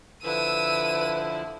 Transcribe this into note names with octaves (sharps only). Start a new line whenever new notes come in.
D3 F3 E4 B4 E6 D#7